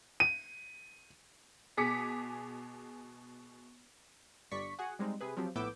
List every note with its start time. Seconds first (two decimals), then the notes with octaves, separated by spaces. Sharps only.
0.20 D#7
1.77 B2 G#4 D6 B6 C#7
4.51 G1 G2 D5 C#6 B6
4.79 F#4 G#4 F#5
4.99 G3 G#3 C4 D#4
5.20 C3 G#4 B4
5.37 F3 F#3 C4 G4
5.55 A#1 A2 B3 D6 E6 G6